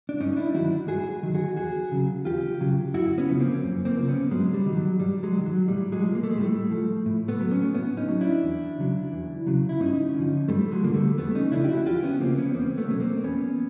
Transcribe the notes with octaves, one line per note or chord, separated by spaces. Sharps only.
D4
G2 C#4 D#4
D#4
D4 E4
D#3 F#3 E4 F#4
G2 F#4 G#4
D#3 F#3
F#4 G#4
E2 F#4 G#4
C#3 F#3
E2 F4 G4
C#3 F#3
F#2 E4 F#4
B3 C#4
C#3 F3
A#3 C4
F#2
A#3 C4
C#3 F3 C4
B3 C#4
G2 F#3 G#3
G3
D#3 F#3
F#3
G2 G3
F#3 G#3
D#3 F#3
F#3
A2 G3
F#3 G#3
F3
A#3
A3
G#3
A2 G3 A3
F3
A2
A3 B3
F#3
B3 C#4
A2 B3 C#4
C#4 D#4
F#3
D4 E4
E2
C#3 F#3
E2
C#3 F#3
E4
G2 C#4 D#4
D3 F3
G2 G3 A3
F#3 G#3
D3 F3 A#3
G3 A3
E2 A3 B3
C#4 D#4
C#3 F3 D4 E4
G4
E4 F#4
E2 F4 G4
B3 C#4
C#3 F3 A#3 C4
B3 C#4
E2 A#3 C4
A3 B3
B2 F#3 C#4
A#3 C4
E2 B3 C#4